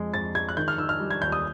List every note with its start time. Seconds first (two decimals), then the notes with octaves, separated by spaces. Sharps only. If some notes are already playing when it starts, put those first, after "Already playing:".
Already playing: F2 G#3
0.13 F2 A6
0.35 G#3 G#6
0.49 F#6
0.57 D#3 G6
0.68 F6
0.78 D#3 E6
0.89 F6
1.00 G3
1.11 G#6
1.22 D#2 G6
1.32 D#6